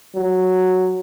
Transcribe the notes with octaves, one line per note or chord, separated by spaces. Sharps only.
F#3